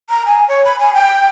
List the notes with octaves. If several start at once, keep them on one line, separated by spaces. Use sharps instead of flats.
A#5
G#5
C#5
B5
G#5
G5